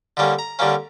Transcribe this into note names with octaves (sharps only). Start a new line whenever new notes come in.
D3 G3 A#3 C#4
A#5
D3 G3 A#3 C#4